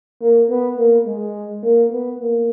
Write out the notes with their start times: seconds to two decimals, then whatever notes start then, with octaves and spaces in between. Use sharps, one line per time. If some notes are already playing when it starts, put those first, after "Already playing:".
0.21 A#3
0.49 B3
0.77 A#3
1.06 G#3
1.63 A#3
1.91 B3
2.20 A#3